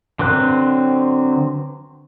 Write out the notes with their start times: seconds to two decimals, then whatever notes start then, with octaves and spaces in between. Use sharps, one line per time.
0.19 D3 F#3 C4 B4 F#6